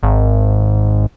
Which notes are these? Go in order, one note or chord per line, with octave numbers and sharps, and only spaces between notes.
G#1